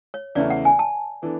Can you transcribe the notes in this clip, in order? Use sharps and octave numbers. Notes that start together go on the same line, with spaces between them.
C#5
E2 C#3 E3 A3 D5
F#5
G#5
A5
E3 B3 D4 A4